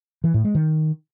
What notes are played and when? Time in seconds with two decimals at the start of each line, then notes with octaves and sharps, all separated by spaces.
0.24 E3
0.34 A2
0.44 G#3
0.55 D#3